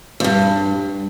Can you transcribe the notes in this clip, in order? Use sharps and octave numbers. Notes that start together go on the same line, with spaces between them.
F2
G2